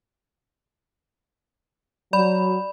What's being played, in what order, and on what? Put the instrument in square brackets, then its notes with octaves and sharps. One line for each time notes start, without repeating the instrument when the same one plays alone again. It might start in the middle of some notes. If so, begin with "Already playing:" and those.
[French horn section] F#3 [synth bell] D5 B5